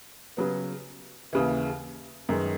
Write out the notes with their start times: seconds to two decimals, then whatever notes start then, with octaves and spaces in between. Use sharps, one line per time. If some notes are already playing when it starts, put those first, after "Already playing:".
0.37 C#3 F#3 B3
1.33 D#2 C#3 E3
2.29 F#2 D#3 G#3 B3